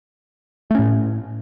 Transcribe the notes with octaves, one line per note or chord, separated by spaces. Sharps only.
A2 A3 C#4